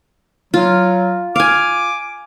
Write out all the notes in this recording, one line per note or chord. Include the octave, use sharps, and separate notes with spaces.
F#3 F4
F5 G#5 D6